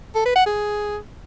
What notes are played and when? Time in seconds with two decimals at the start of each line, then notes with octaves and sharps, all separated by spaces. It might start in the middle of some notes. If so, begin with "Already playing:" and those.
0.15 A4
0.25 B4
0.36 F#5
0.46 G#4